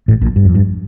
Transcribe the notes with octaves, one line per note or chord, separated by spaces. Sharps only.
A1 A2
A#1 A#2
G2
F2
G2